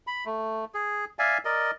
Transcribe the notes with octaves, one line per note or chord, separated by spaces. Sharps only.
B5
A3
G#4
D5 E5 F5 G#5
A#4 D5 D#5